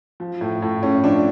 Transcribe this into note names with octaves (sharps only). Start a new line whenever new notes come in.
F3
A2
A2
A2 C#4
F3 D4